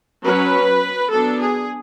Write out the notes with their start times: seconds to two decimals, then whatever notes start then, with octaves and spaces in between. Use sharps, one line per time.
0.25 F#3 C#4 B4
1.10 F#3 B3 D4 A4
1.40 G#4